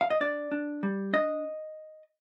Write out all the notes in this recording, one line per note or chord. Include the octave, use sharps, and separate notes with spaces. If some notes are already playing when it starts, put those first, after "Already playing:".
F5
D#5
D4 D5
D4
G3
D4 D#5